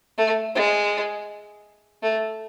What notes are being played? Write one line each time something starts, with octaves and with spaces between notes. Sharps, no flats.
A3
G#3
A3